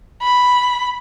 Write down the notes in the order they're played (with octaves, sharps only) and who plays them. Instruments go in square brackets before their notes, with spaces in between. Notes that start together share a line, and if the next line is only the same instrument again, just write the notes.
[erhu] B5